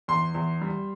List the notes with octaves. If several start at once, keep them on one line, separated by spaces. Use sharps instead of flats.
E2 C6
E2
G3